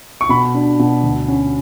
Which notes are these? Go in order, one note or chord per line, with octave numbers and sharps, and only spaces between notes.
C#6
B2 B5
D4
B2
D2
C#4